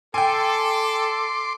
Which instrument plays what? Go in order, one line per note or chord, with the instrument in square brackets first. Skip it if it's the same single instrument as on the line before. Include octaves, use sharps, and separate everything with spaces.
[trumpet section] A4 [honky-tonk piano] G5 G#5 [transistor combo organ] C6 D6